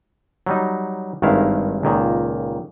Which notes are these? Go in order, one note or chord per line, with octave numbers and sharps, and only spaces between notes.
F#3 G3 D#4
G#1 G2 D#3 G#3 E4 F5
C#2 A#2 D#3